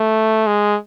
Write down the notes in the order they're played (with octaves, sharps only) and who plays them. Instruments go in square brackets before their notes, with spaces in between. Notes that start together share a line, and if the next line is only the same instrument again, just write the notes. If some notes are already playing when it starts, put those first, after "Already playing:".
Already playing: [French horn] A3
G#3